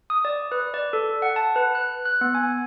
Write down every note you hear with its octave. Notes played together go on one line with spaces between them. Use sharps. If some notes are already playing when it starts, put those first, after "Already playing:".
D#6
D5
B4
D5
A4
F#5
A5
B4
F#6
F#6
B3
G#5